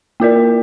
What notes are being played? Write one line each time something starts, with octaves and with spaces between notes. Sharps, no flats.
A#3 F4 A#4 D5